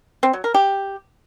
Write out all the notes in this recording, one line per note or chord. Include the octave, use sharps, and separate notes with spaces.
C4
F#3
A#4
G4